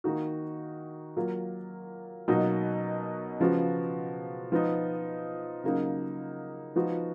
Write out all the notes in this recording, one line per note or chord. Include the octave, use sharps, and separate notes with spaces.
D#3 A#3 D#4 F#4
F#3 A#3 F4
B2 F#3 A#3 D#4 F#4
C#3 F3 B3 F#4
F3 B3 D#4
C#3 F#3 A#3 D#4
F3 B3 D#4 F#4